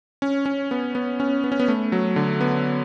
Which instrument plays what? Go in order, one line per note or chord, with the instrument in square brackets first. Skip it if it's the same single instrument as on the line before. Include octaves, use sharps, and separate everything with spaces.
[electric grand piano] C#4
C#4
B3
B3
C#4
B3
C#4
B3
A3
F#3
D3
B3